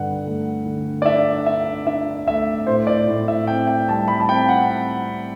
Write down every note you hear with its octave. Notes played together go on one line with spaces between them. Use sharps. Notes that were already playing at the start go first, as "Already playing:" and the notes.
Already playing: G2 D3 F#5
A3
D3
D5
D4 E5
D4 E5
D4 E5
A3 E5
A2 C5
D5
A2
E5
C4 G5
G5
G3 A5
B5
A5
C4 G5
F#5